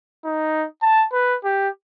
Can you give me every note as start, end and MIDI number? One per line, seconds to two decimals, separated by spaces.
0.24 0.66 63
0.82 1.05 81
1.13 1.36 71
1.44 1.69 67